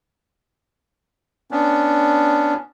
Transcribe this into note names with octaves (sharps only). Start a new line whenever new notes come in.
B3 C#4 D4